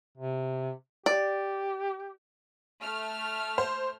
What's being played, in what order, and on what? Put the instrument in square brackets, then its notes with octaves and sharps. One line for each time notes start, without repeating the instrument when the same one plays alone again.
[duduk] C3
[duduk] G4 [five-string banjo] D5
[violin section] A3 F6
[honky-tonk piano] C5